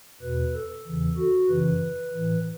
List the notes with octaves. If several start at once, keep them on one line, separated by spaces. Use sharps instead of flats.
E2 B2 B4
A4
E2 C#3 E3
F#4
F#2 C#3 E3 B4
A2 E3